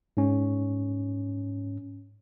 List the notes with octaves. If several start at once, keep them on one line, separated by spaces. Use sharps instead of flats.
G#2 C#4